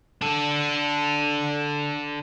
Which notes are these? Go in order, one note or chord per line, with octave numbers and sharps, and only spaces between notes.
D4 A4